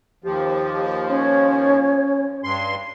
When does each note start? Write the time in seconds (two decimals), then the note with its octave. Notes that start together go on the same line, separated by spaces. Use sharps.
0.24 D#2 F3 G4
1.09 C#4 C#5
2.44 G2 C6